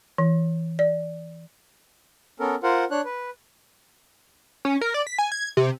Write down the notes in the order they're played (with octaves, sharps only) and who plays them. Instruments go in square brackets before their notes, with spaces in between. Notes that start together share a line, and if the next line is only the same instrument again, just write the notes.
[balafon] E3
D5
[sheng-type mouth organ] B3 C#4 A4 A#4
F4 A#4 C5 F#5
D4 C#5 F#6
B4
[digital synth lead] C#4
A#4
D5
B6
G#5
G#6
C3